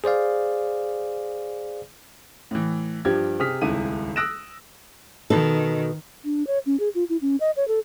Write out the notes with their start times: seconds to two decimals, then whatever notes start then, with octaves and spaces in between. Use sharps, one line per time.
0.04 G#4 C5 D5 F5
2.51 A2 E3
3.05 G2 F3 G3 G4 G#6
3.39 C3 G#4 D#6 F6 B6
3.61 D#1 G#1 C#2 E4 E5 D#7
4.16 D#6 E6 F#6 A#6 D7 E7
5.30 B2 D#3 D#4 A4
6.25 D4
6.47 C#5
6.66 C#4
6.80 G#4
6.95 F4
7.09 E4
7.22 C#4
7.40 D#5
7.57 C#5
7.68 A4